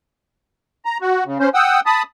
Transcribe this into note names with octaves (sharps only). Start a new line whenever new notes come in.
A#5
F#4
C#3
C#4 C5
F#5 G5 D#6 E6
A5 B5 D#6